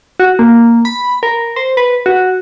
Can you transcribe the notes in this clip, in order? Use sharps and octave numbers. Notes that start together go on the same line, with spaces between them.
F#4
A#3
B5
A#4
C5
B4
F#4